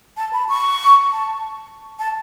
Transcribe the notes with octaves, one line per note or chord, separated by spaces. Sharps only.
A5
B5
C#6
A5
A5